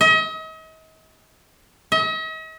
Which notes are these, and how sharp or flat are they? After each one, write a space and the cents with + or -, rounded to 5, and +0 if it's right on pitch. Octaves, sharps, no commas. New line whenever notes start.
D#5 +40
D#5 +45